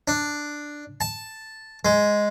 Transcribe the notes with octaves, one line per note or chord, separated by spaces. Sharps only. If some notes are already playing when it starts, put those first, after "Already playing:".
D4
A5
G#3